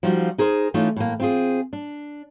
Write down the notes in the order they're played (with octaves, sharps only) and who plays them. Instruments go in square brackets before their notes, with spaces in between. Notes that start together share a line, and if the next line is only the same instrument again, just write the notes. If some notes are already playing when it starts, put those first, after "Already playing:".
[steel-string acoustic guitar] F3 G3 D#4 F4 F#4
D#4 G#4 A#4 C5
E3 A3 C#4 D#4 F4
A2 A#3
C4 F4 G#4
D4